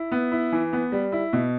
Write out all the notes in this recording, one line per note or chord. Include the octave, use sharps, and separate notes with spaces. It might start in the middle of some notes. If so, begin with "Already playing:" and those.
Already playing: E4
B3
E4
E3
B3
G3
E4
B2